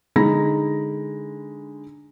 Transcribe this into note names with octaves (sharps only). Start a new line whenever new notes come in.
D3 G#3 D#4 A#5 B5 A#6